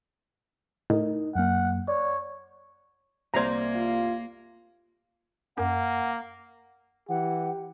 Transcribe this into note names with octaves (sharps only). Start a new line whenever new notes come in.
A2 D#4 A#4 D#5
F#2 A#3 F#5
C#5 D5
C2 A#3 C5 D5 A#5 G#6
F4
F#2 A#3 F#5
E3 G4 F#5